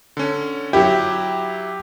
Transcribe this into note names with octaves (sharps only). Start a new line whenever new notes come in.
D3 C#4
F#3 E4 G4